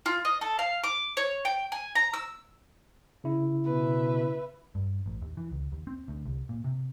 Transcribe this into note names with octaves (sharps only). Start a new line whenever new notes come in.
F4
D#5
A4
F5
D6
C#5
G5
G#5
A#5
E6
C#3 E4
B2 B4 E5
G2
A1
D#2
E3
C#2
D#2
C4
D2
C2
A#2
C3